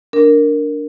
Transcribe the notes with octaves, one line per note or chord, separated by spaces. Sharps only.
D4 A#4